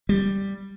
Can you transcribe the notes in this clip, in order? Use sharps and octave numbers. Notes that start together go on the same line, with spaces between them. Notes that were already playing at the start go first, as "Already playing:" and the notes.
G3